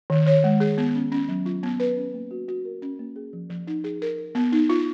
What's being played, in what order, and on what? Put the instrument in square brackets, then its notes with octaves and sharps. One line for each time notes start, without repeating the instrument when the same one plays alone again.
[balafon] D#3
C#5
G#3
G#4
B3
C#4
C#4
F#3
F4
B3
B4
C#4
A#3
F#4
F#4
A#4
C#4
A#3
G#4
F3
F3
D#4
G#4
A#4
A#4
B3
D#4
F4